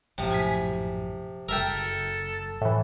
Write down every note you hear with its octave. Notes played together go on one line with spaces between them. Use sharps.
A#1 F#2 A2 C3 F3
G#5 B6
F#1 A4 A#4 E5 G5 E6
A2 E3